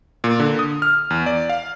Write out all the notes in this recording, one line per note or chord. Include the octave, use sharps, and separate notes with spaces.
A#2
D3
D#6
F6
E2
D5
F5